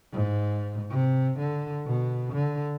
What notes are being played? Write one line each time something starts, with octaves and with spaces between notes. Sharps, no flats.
G#2
C3
D3
B2
D3